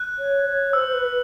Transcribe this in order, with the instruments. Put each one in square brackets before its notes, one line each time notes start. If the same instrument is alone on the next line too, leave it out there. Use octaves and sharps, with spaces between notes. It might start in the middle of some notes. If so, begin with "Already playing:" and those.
Already playing: [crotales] F#6
[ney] C#5
C#5
[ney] C5 [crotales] E6
[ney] C5
B4
B4